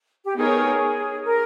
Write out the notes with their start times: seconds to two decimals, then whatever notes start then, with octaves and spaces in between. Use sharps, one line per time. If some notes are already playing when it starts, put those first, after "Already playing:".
0.24 G4
0.36 B3 D#4 G#4 A#4 C#5
1.25 A#4